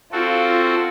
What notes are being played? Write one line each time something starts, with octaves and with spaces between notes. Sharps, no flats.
C4 F4 F#4 A4